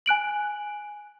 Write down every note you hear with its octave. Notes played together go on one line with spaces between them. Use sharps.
G#5 F#6 D7 F#7